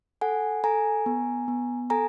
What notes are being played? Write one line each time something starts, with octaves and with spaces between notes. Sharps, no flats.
A4 F#5 G#5
A4 G#5 A#5
B3
B3
A4 G#5 A#5